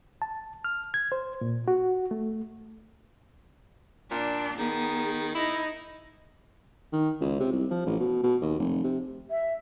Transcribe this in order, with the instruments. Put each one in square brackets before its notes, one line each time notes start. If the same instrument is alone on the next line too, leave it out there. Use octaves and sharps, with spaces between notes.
[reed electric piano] A5
F6
G#6
C5
A#2
F#4
A3
[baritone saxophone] A#2 [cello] D4
[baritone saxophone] D#3 [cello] B3 G#4
[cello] D#4 [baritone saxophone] E4
[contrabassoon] D#3
C#2
C3
C2
F3
A1
B2
B2
D#2
F1
C3
[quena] E5